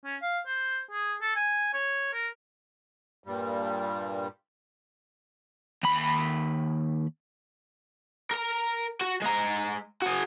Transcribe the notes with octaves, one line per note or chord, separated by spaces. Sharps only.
C#4
F5
C5
G#4
A4
G#5
C#5
A#4
G2 A#2 G3
D#2 B5
A#4 A#5
F#4
G#3 A#5
F#4 G#4